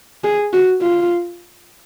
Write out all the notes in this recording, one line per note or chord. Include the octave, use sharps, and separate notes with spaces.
G#4
F#4
F4